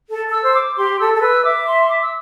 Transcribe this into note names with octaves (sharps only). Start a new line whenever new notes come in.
A4
A4 E6
C5
D6
G4 C6
A4 E6
A4
B4 E6
E5 D6
C6
D6
E6